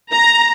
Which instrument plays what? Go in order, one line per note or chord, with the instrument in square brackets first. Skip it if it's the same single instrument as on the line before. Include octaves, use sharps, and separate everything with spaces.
[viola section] A#5